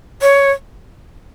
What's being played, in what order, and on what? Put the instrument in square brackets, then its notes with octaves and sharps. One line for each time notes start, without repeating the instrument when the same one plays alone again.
[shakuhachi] C#5